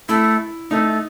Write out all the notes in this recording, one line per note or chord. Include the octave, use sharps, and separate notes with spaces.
A3 E4
A3 D#4